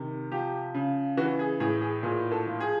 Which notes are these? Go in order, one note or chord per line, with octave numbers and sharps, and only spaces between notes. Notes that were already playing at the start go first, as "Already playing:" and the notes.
Already playing: C3 D#3
F3 G4
C#3
E3 F#4
G#4
A2 G#4
G#4
A#2 G#4
A4
F3
G#4